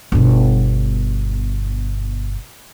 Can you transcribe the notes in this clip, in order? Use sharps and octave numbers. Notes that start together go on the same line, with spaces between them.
G1 B2